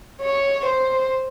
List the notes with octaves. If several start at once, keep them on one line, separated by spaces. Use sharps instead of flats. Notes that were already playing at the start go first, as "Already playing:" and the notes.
C#5
C5